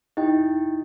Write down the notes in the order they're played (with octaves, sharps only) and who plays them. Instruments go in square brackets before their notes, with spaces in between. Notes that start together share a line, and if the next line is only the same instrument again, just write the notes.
[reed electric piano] D#4 [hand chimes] E4 G4 D#5 G5